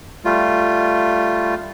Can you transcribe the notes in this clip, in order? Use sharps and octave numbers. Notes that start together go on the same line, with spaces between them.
G3 A3 F4